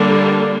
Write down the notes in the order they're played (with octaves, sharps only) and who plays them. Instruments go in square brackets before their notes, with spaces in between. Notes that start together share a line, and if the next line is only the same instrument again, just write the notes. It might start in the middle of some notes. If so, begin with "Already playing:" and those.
Already playing: [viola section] D3 G3 A#3 D4